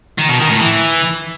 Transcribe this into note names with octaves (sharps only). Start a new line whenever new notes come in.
D#3
B2
D#3
A2
E3